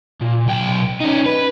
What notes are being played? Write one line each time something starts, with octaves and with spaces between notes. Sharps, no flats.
A#2
B1 G5
C#4 D#4
B4